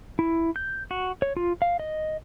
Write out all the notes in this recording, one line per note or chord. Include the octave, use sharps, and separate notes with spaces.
E4
G6
F#4
C#5
F4
F5
D#5